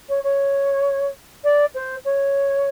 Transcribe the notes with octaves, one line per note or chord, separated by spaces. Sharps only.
C#5
C#5
D5
C5
C#5